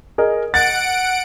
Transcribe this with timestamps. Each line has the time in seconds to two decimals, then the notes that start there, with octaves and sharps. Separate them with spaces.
0.18 G#4 A#4 D#5
0.54 F#5 A6 D7